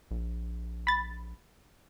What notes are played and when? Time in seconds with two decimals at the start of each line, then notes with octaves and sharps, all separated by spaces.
0.11 A#1
0.87 B5 A6